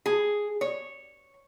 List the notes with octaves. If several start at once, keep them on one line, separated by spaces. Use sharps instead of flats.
G#4
C#5